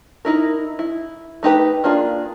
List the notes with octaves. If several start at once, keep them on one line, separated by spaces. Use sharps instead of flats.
D#4 E4 A#4
E4
A3 D#4 G4 B4
A#3 D4 F4 G#4